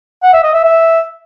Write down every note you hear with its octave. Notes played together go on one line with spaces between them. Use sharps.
F#5
E5
D#5
E5
E5